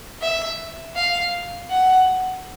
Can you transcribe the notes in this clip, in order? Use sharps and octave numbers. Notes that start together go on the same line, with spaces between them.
E5
F5
F#5